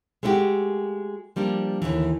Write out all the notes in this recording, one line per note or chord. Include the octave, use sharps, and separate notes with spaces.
G#3 A3 C#4 E4 F#4 G4
F3 G3 A#3 D4
D#2 G#2 D3 E3